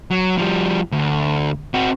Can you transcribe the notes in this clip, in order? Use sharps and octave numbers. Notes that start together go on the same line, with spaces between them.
F#3
F3 G3
D2
C4 F#4